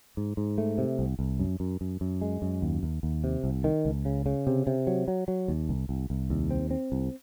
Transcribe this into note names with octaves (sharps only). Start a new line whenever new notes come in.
G#2
G#2
A3
C3
C2
C2
F#2
F#2
F#2
F#2
G#3
F#2
D#2
D#2
D#2
C3
C2
D#3
C#2
C#3
C#3
C3
C3
F#3
F#3
F#3
D#2
C2
C2
C2
D#2
C4
C4
C2